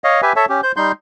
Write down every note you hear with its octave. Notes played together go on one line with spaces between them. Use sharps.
C#5 D#5 F5
G4 B4 E5 G#5
A4 C#5 E5 A5
C#4 G4
C5 G6
G3 D#4 C6 G6